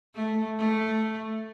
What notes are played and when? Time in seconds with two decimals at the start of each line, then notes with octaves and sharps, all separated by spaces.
0.15 A3
0.58 A3